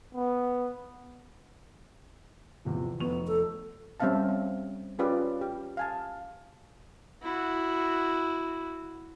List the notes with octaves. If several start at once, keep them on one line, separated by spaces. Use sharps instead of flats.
B3
E2 C3 F3
F1 B3 C#6 F7
A4
G3 C4 C#4 E5 F5 A5
C4
C#4 F4 G4 G#4 B4 D5
G4
F5 G#5 A5
E4 F#4